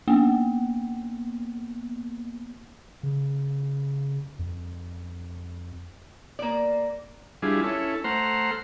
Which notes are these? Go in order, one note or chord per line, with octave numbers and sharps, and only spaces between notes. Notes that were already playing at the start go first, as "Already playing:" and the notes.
A#3 B3
C#3
F2
A#3 D5
G3 D4 E4 F4 G#4
C#4 E4 A4
A3 C5 F#5 A#5 C6 F6